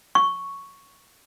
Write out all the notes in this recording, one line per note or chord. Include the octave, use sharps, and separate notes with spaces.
C#6